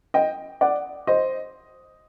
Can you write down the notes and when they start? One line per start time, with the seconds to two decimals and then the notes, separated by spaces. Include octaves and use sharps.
0.14 D#5 G5
0.61 D5 F#5
1.07 C5 D#5